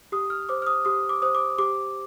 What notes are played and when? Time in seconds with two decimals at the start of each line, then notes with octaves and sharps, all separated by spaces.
0.12 G4 D#6
0.30 F6
0.49 C5 D6
0.62 F6
0.67 D#6
0.85 G4 D#6
1.09 D6
1.22 C5 D#6
1.35 D6
1.58 G4 D6